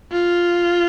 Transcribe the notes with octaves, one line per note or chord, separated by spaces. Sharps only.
F4